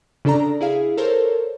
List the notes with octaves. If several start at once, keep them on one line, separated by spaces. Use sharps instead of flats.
C#3 D4 A4 D5 A#5
E4 G#4 F5
A4 A#4 C5 C#5